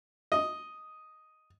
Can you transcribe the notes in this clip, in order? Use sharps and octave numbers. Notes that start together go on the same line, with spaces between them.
D#5